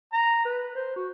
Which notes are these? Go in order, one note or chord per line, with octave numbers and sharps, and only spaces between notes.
A#5
B4
C5
F#4